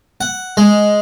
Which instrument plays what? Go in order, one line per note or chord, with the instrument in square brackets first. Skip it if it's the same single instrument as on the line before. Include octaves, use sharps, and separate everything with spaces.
[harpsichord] F#5
G#3